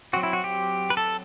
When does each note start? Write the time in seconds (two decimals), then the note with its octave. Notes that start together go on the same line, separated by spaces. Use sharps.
0.13 F#3 C4 F#4
0.23 E4
0.33 F#4
0.44 G4
0.90 B4
0.97 A4